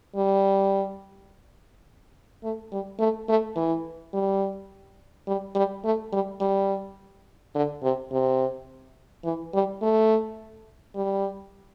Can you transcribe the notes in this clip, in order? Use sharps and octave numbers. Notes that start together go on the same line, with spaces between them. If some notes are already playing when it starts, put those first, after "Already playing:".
G3
A3
G3
A3
A3
E3
G3
G3
G3
A3
G3
G3
D3
C3
C3
E3
G3
A3
G3